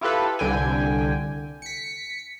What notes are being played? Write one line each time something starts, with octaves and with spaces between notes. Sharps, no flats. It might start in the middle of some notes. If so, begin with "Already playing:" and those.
E4 F4 G4 A4 B4
C2 D3 G5 G#5
B6 C#7